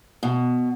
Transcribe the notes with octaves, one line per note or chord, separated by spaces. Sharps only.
B2